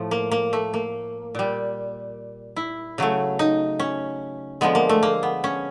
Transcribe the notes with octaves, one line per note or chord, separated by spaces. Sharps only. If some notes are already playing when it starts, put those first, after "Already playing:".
Already playing: A2 F3 A3
A#3
A#3
A3
A#3
A#2 G3
E4
C#3 F#3 A3
D#4
C#4
D3 F3 G#3 B3
A#3
A3
A#3
B3
C#4